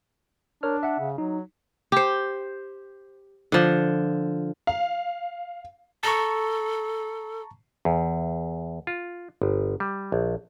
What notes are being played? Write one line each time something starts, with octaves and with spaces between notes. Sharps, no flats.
D4 A#4 C#5 F6
E5 F#5
C#3
F#3 D#4
G4 C5
D3 F3
F5
A4 A5 A#5 C#6
E2
F4
G1
G3
A#1